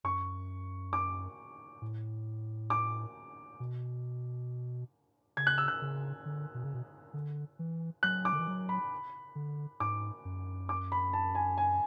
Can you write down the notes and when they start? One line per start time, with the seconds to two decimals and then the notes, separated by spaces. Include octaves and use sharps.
0.04 F#2 C#6
0.93 D6
1.82 A2
2.70 D6
3.60 B2
5.37 C#3 G#6
5.47 F#6
5.58 E6
5.68 F#6
5.82 C#3
6.26 D3
6.54 B2
6.64 C#3
6.74 B2
7.14 D3
7.59 E3
8.03 F#3 F#6
8.25 D6
8.33 D3
8.39 E3
8.47 F#3
8.69 B5
9.35 D3
9.80 G#2 D6
10.25 F#2
10.69 D6
10.92 B5
11.13 A5
11.35 G#5
11.58 G#5